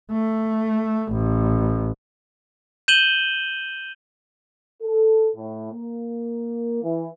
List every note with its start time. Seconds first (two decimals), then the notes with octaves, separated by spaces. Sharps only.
0.12 A3
1.12 A1
2.88 G6 D#7 E7 F#7 G7
4.82 A4
5.35 A2
5.72 A#3
6.83 E3